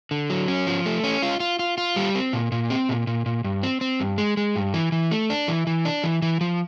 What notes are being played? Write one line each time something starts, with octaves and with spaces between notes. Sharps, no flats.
D3
F#3
C#4
F3
A3
C#4
F4
F4
F4
F4
G3
C4
A#2
A#2
C4
A#2
A#2
A#2
G2
C4
C4
G2
G#3
G#3
G2
E3
E3
A3
D4
E3
E3
D4
E3
E3
F3